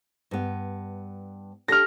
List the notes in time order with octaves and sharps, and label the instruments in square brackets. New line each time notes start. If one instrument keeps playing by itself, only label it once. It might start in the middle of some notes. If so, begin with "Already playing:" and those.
[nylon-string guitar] G2 B3
[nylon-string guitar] D4 G4 A4 [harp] F6 A#6